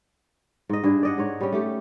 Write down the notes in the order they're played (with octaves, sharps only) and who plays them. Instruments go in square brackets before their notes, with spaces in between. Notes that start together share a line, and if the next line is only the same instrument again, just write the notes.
[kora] G#2 D#5
G2 D4 G#4
D5 D#5 F#5
G#2 C#5
G3 C#4
A3 G4